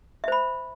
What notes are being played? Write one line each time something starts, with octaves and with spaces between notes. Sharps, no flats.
C5 E5 B5